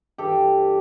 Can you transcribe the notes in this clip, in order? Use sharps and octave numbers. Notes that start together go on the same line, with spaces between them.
G2 E3 G4 A4